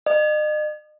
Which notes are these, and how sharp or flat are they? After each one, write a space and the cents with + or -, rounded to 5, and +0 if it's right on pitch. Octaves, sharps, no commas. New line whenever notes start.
D#5 -40